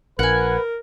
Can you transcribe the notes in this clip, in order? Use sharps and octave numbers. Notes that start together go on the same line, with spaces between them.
A#1 A#4 B4 F#5 G#5